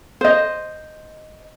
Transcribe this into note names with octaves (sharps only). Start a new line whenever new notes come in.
C5 D#5